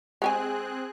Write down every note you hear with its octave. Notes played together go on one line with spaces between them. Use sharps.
G#3 C4 G4 G#4 G#5 F#6